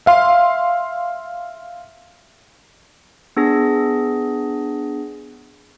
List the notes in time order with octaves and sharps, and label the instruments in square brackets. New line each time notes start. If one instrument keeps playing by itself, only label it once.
[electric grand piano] E5 F5 C6
[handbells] B3 D4 G#4 A#6